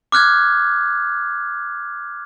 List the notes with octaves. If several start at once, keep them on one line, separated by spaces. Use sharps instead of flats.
D6 F6 F#6 G#6